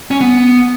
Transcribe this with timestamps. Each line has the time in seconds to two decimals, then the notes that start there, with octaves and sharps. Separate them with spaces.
0.11 C#4
0.21 B3